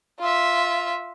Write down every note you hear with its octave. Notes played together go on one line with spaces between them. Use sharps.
F4 E5